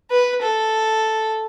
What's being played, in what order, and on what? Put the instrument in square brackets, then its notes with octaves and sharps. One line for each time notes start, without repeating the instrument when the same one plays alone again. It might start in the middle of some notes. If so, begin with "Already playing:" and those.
[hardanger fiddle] B4
A4